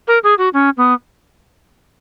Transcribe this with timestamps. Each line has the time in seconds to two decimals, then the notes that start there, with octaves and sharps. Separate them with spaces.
0.07 A#4
0.23 G#4
0.38 F#4
0.53 C#4
0.77 B3